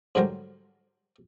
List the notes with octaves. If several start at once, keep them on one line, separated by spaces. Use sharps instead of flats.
G#2 D3 F#3 G3 A#4 C5